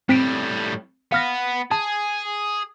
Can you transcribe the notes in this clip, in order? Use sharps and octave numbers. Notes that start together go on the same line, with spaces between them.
A2 G3 C4 B6 D7
B3 F5 F6 A#6
G#4 A5